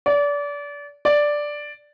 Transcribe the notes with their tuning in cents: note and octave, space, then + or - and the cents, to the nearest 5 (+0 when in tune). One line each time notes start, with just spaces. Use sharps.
D5 -30
D5 +0